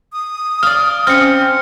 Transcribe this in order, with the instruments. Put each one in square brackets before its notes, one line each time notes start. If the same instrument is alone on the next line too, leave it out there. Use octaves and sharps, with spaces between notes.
[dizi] D#6
[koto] D5 F5 [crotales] F6
[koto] C4 [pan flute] C#4 [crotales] F6 C#7